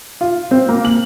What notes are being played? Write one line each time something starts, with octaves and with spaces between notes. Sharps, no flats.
F4
C4
A#3
F#7